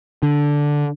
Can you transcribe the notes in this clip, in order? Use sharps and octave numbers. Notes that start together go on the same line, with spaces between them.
D3